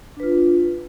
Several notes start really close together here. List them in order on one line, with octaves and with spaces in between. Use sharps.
D4 B4 F4